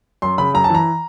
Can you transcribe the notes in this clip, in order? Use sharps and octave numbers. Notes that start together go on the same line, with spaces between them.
F#2 C6
C#3 B5
F#2 A#5
A5
E3 A#5